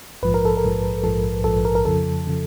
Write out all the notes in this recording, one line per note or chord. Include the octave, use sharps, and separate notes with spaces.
A#1 G#2 F3 B4
A#4
A4
A#4
A#1 G#2 F3
A#1 G#2 F3 A4
A#1 G#2 F3 A4
A#4
A#4
F2 C#3 F3 A4
C#3 F3